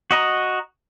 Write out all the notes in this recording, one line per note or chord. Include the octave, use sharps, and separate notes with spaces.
F#4 D#5 A#5